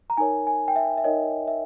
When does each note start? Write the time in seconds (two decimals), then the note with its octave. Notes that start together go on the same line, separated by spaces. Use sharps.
0.10 A#5
0.17 D#4 A#4 C#5 G#5
0.47 G#5
0.68 G5
0.76 E5
0.98 E5
1.04 D#4 A#4 C#5 D#5
1.47 E5